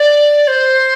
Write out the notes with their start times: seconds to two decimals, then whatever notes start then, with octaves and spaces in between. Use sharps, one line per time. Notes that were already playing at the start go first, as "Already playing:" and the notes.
Already playing: D5
0.48 C5